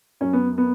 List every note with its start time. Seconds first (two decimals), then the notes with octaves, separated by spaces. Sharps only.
0.21 F#2 C#4
0.33 B3
0.58 B3